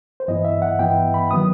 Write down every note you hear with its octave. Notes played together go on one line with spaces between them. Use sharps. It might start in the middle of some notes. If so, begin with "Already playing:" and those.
C5
G2 E3 B3 E4 D#5
E5
F#5
G2 E3 B3 E4 G5
B5
D#3 F#3 B3 D#6